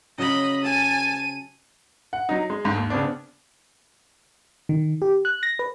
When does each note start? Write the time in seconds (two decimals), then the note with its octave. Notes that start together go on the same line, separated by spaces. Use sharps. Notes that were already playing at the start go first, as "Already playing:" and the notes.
0.18 C#3 F#3 D#5 B5
0.63 G#5 A5 D#7
2.13 F#5
2.29 F#3 D#4
2.50 G#3
2.64 G1 G#2
2.78 D#2
2.90 C#3 B3 C4 D4
4.69 D#3
5.02 G4
5.25 F#6
5.43 A#6
5.59 B4